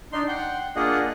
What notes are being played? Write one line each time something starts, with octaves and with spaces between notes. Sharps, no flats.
D4 D#4 C6
F#5 G5 C6
A#3 D4 F4 G#4 D#5 F#5